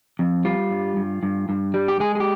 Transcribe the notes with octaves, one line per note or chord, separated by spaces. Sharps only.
F2
G3 F4
G2
G2
G2
G2
G3
G4
G#3 G#4
G#4
G4